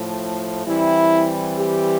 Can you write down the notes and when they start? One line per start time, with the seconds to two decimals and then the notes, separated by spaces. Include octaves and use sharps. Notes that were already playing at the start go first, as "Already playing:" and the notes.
Already playing: A2 F3 A3
0.67 E3 G3 C4 E4
1.58 G4